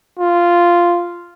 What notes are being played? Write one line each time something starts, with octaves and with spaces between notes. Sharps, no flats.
F4